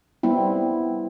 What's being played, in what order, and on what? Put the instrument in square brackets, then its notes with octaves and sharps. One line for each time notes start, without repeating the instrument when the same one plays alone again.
[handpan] G3 B3 C4 E4